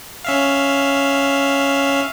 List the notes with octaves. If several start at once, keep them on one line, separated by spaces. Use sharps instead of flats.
C#4 E5 F5